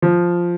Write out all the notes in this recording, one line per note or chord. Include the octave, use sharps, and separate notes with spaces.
F3